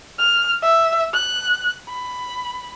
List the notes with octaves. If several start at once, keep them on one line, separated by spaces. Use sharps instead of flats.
F6
E5
F#6
B5